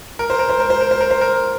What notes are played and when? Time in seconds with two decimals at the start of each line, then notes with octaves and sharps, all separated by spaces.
0.19 A#4
0.30 C5
0.39 A#4
0.49 C5
0.60 A#4
0.70 C5
0.81 A#4
0.91 C5
1.01 A#4
1.11 C5
1.21 A#4